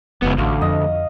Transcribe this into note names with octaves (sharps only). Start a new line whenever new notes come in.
F1 C#2 B3
A1 D2 F5
F2 D#5